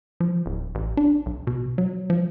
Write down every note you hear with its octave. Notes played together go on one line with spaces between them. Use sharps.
F3
D1
A1
D4
B1
B2
F#3
F3